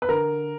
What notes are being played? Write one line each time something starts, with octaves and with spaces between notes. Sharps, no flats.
B4
D3 A#4